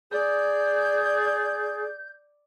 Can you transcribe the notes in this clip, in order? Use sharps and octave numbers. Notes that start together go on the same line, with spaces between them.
G#4 D5 G6